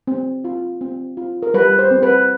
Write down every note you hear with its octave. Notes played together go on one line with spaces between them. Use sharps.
C4
F4
C4
F4
A#4
G3 B4
C5
C4
B4